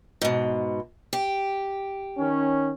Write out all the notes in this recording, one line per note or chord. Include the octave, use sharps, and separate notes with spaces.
G#2 B2
G4
D#3 C#4